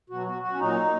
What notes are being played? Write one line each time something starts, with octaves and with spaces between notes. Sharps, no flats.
B2 F#3 F#4
F#4
F#4
C#4
A#2 F#3 D#4